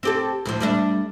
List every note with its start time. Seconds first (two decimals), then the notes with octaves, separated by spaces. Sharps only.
0.03 C4 G4 A4
0.45 D2 A2 F3
0.61 G3 A3 D4